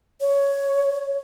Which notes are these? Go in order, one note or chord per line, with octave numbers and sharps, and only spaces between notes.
C#5